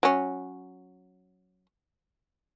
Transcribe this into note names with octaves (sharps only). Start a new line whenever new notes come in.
F#3 C#4